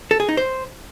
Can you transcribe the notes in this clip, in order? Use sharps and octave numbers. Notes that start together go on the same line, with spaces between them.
A4
G#4
D#4
C5